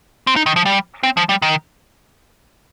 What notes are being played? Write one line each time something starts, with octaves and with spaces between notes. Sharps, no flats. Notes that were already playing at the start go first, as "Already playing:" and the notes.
C4
D#4
D#3
F3
G3
C4
F3
G3
D#3